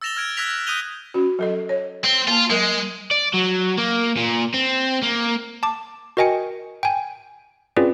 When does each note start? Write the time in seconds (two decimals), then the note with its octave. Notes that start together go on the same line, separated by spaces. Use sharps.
0.01 E6 A6 A#6 E7 F7 G7
0.17 F6 G#6 D7
0.37 E6 F#6 G#6 A#6 B6 F7
0.67 D#6 F#6 G6 D#7 F7 G7
1.14 C#4 F#4
1.39 F#3 A4 D#5
1.69 C#5
2.04 C4
2.28 A#3 F4 A5
2.50 F#3 G#3 A#4
3.11 D5
3.34 F#3
3.78 A#3
4.17 A#2
4.54 C4
5.02 A#3
5.63 A5 D6
6.17 F#4 A#4 D#5 G5 G#5 C#7
6.83 G5 G#5
7.76 C4 C#4 F4 G#4 B4 D5